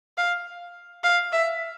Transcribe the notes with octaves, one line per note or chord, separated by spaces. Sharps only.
F5
F5
E5